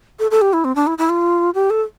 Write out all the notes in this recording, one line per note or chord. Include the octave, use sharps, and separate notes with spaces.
A4
A4
G4
E4
C4
D4
E4
E4
F4
G4
A4